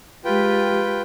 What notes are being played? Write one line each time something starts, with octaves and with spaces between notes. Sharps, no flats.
G#3 F4 G4 B4 G5